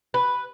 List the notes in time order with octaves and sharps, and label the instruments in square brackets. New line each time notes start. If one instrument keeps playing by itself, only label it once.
[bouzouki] B4